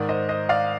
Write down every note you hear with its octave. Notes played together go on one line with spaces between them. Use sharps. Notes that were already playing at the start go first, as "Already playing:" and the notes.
Already playing: G#2 D#3 A#4 D5
C5 D#5
C5 D#5
D5 F5